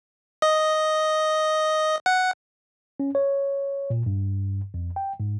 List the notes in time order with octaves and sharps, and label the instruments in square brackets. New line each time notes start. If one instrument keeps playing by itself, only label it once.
[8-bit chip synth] D#5
F#5
[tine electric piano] C#4
C#5
A#2
G2
F2
G5
G#2